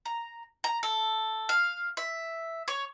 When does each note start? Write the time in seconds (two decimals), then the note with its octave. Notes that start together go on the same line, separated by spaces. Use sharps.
0.05 A#5
0.64 A#5
0.83 A4
1.49 F5
1.97 E5
2.68 C#5